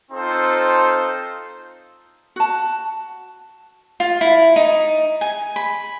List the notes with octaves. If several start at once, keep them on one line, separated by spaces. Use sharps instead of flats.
C4 D#4 F4 A4 C5
F#4 A5
F4
E4
D#4
G#5
B5